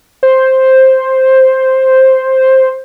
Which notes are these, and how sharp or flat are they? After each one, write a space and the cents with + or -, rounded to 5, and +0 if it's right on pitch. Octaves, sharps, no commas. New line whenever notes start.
C5 +5